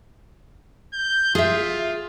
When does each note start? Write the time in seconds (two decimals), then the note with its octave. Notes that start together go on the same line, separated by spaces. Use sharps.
0.93 G6
1.35 F4 G#4 E5